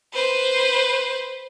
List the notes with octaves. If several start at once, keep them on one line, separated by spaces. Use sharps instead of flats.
B4 C5